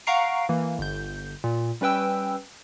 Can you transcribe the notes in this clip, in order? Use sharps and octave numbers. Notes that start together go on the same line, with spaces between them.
F5 F#5 A#5 C#6 C7 D7
E3 A#3
G1 G6
A#2
G3 C#4 B4 G5 E6